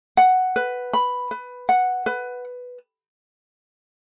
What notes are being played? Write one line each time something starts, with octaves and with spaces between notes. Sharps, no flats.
F#5
B4
B5
B4
F#5
B4